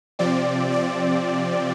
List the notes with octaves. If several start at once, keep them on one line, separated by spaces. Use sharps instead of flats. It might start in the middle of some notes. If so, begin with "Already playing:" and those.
C3 F3 C4 D5
D5